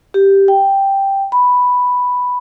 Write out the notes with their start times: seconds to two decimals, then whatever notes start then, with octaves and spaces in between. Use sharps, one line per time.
0.14 G4
0.48 G5
1.32 B5